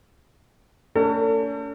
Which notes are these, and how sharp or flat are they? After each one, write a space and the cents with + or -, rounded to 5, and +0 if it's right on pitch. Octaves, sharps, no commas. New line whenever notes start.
A3 +35 C#4 +45 A4 +45